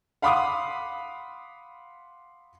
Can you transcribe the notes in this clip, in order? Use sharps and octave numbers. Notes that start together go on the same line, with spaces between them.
F5 F#5 B5 C6 D6 D#6